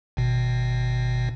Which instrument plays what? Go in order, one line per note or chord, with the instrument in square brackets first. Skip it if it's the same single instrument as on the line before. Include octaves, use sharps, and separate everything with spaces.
[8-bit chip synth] G#1 B2